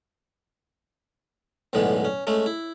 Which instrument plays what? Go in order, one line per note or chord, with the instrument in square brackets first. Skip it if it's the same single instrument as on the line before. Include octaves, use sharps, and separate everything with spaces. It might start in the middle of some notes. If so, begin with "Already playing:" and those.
[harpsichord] B1 F#2 A2 D3 G#3 B3
C#4
G#3 A3 C#4
E4